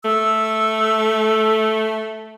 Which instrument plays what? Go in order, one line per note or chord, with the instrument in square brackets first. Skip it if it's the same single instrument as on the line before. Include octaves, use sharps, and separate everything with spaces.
[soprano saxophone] A3 [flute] E6